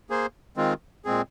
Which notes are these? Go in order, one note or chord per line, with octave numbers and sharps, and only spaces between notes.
A#3 G#4 C5
D#3 G#3 C4 F4
A#2 G#3 C4 G#4